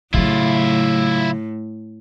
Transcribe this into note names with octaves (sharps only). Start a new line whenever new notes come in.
A2 C#3 F#3 E4 F4